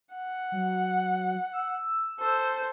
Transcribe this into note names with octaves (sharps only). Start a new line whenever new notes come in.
F#5
F#3
E6
A4 C5